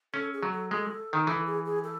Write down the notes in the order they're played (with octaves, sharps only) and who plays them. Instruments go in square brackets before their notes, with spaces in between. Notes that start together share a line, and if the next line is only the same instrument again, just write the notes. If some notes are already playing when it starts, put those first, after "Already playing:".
[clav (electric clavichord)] C#4 [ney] A4
[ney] G#4
[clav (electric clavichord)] F#3
[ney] A4
[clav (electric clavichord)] G#3 [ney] A4
[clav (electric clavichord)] D#3
[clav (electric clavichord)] E3 [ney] A4
[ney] G#4
G#4
A4